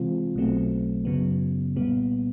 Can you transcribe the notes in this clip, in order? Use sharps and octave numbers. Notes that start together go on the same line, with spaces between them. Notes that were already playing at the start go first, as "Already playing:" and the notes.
Already playing: C3 E3 G#3 C4 F4
B1 B2 F#3 A3 C4
F#2 C#3 F#3 B3
C2 A#2 G3 B3